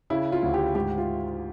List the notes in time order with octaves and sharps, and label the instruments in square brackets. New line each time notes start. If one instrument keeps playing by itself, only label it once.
[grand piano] C#3 E4
F4
D2
G4
G#2 G4
F4